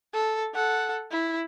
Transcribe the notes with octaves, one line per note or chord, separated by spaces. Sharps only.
A4
A4 F#5
E4